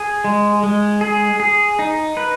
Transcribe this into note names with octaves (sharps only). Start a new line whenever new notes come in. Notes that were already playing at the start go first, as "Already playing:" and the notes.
Already playing: G#4
G#3
G#3
G#4
G#4
D#4
B4